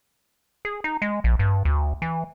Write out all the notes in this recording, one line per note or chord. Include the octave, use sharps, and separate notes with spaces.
G#4
D#4
G#3
A#1
G2
D2
E3